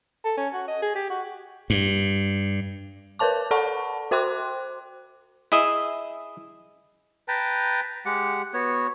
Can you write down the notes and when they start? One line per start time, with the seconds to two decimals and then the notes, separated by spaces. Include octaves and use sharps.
0.25 A4
0.38 C#4
0.54 F#4
0.68 D#5
0.82 G#4
0.95 G4
1.10 F#4
1.70 G2
3.19 A#4 B4 C#5 A5 D6
3.51 A4 D5 F#5 A5 B5 C#6
4.11 F#4 C5 G5 C6 D6 F#6
5.52 E4 G#4 D#5 E5
7.28 B4 G5 A5 A#5
8.06 G#3 G4 F#5
8.54 B3 F#4 C#5